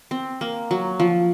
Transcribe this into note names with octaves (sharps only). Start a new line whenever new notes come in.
C4
A#3
F#3
F3